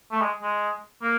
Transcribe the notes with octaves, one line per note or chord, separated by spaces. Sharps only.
A3
G#3
G#3
A#3